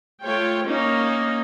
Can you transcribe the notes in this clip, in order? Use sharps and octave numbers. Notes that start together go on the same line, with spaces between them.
A3 F4 C#5 G5
A#3 C#4 D#4